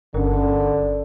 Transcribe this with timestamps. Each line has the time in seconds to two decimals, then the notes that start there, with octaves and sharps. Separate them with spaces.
0.14 G1 D3 C#4 A#4